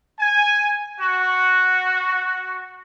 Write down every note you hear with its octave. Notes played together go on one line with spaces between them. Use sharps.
G#5
F#4